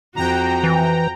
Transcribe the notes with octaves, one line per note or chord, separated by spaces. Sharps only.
F2 F#4 G5 A#5
E3